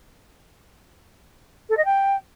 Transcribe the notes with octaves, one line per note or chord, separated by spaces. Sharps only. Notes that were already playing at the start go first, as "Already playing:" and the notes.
A4
D#5
G5